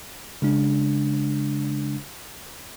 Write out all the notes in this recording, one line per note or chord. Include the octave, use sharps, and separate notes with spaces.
C#3 G#3 D4